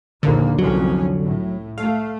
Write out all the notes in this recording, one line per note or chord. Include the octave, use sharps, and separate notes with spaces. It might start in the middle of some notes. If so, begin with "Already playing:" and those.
A#1 D#2 D3 A#3
C2 F2 F#3 C#4
A2
A3 F5